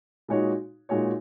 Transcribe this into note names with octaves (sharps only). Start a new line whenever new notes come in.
A#2 G#3 D#4 F#4 C#5
A#2 G#3 D#4 F#4 C#5